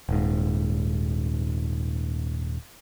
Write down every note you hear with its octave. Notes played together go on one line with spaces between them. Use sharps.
D#1 G#2